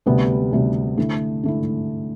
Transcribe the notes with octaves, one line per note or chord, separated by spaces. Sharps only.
D2 C3 G3 B3
D2 C3 G3 B3
D3 A3 E4
D3 A3 E4